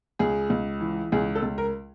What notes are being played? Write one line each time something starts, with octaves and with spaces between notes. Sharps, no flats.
C#2 G#4
C#2
E3
C#2 G#4
A4
C#2
A#4